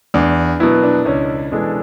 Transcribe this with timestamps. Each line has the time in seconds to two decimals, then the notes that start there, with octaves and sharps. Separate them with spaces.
0.14 E2 D4
0.60 B2 F#3 B3 E4
0.83 D4
1.05 C#2 C#4
1.52 B2 E3 G#3 D4 A4